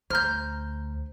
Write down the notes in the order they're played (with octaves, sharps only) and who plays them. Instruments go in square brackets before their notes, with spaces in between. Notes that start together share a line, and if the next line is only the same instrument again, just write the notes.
[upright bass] D2 [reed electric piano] C5 A#5 [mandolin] F6 G6